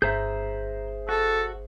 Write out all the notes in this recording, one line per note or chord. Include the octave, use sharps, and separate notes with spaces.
G1 G#4 C5 E5 A#5 G6
F#4 A4